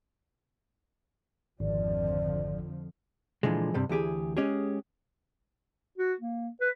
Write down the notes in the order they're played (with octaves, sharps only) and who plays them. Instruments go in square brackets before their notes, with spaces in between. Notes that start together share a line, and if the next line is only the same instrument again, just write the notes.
[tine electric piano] G#1 [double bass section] F2 D3 F3 [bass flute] D5
[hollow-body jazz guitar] A#2 D3 E3 F3 G#3
G2 C3 G3
D2 E3 G4 G#4
G#3 C#4 G4 G#4
[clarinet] F#4
A#3
B4